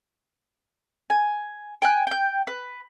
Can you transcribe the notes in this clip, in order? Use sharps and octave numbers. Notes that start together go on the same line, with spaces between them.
G#5
G5 G#5 F#6
G5 G6
B4